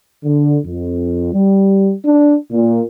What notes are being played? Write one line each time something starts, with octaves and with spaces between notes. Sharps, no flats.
D3
F2
G3
D4
A#2